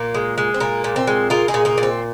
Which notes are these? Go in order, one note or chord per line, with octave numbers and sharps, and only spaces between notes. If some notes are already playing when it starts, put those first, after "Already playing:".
Already playing: A#2 A#3
G#3
G#3
C4
A#2 A#3
A#2
C4
G#3
G#3 F4 A#4
D#4 G#4
A#2
A#3 D#4
A#2
C4